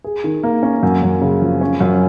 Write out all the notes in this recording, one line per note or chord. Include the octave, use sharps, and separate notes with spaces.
G#4
D#3
A#3
C#4
F#2
F#2
C#3
F3
C#4
F#2